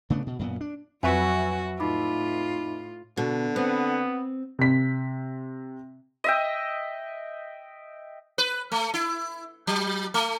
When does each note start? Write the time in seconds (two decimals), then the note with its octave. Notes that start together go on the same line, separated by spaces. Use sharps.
0.10 C#3 A3 B3 D4
0.27 B2
0.39 F#2 A#2 B3
0.61 D4
1.03 F2 F#3 F#4 B4 E5 G#5 C#6
1.80 A2 D#4 F4 B5 D6
3.17 B2 D3
3.56 B3 C4
4.59 C3 B6
6.24 D#5 E5 G5
8.38 B4
8.72 A3
8.94 E4
9.67 F#3
10.14 A3